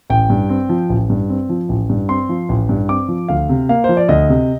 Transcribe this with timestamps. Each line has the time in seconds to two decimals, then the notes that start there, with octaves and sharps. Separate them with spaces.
0.10 A1 G5
0.30 G2
0.49 C4
0.69 F3
0.90 A1
1.10 G2
1.29 C4
1.49 F3
1.69 A1
1.90 G2
2.09 C4 C6
2.29 F3
2.49 A1
2.69 G2
2.89 C4 D6
3.08 F3
3.28 D2 F5
3.49 C3
3.69 A#3 F5
3.84 F3 C5
3.97 D5
4.09 D2 D#5
4.29 C3